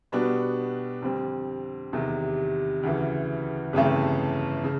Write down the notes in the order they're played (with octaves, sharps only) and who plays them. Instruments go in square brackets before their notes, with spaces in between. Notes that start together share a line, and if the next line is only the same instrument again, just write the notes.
[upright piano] B2 G3 B3 D4 F#4
F2 D3 G3 C4
E2 C3 D#3
D2 C#3 E3
G1 F2 C#3 E3 A3
C#3